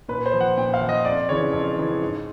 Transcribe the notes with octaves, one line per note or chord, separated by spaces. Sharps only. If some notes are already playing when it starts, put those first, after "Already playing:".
A#2 B4
C5
F3
F#5
A#2 G5
F5
F3
D#5
F2 D5
C#3 E3 C#5
F2
C#3 E3
G#2